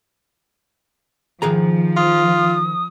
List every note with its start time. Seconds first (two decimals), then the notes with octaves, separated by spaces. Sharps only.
1.42 D#3 F3 G#4 A#5
1.97 F4 D#6